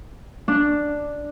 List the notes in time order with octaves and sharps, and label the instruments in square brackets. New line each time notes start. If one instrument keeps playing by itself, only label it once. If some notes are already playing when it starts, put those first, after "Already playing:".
[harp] D4